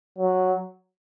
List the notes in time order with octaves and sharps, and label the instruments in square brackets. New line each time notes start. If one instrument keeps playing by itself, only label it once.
[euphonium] F#3